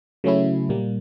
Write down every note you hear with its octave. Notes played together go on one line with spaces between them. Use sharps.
C#3 F#3 A3 C#4 E4
A#2 G3 A#3